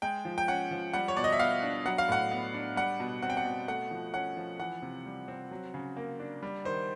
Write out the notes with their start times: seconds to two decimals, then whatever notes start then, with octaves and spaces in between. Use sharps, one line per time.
0.02 G#3 G5
0.25 F3
0.38 G5
0.48 C#4 F#5
0.71 F3
0.93 G3 F#5
1.08 C#5
1.16 B2 D5
1.24 D#5
1.32 E5
1.39 B3 F5
1.63 D4
1.85 F#3 F#5
1.98 F5
2.08 A2 F#5
2.31 B3
2.54 D4
2.76 G3 F#5
3.00 B2
3.22 C4 F#5
3.30 G5
3.37 F#5
3.45 B2
3.68 A3 F#5
3.91 F3
4.14 C#4 F#5
4.37 F3
4.59 E3 F#5
4.82 C3
5.06 G3
5.28 C4
5.51 F#3
5.74 C#3
5.97 A#3
6.20 D4
6.43 G3
6.65 D#3 C5